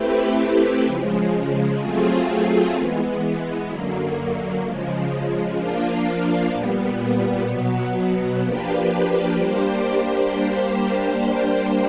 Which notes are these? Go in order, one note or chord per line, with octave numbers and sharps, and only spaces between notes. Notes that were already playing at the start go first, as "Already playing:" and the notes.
Already playing: A3 C4 E4 G4 B4
C#3 F3 G#3
F#3 A3 C4 F4 G#4
E3 G#3 B3
F#2 D3 F#3 A#3
C#3 F3 G#3
F3 A#3 D4 F4
A#2 G3 B3
B2 F#3 B3
F3 A#3 D4 G4 B4
G3 A#3 D4 G4 C5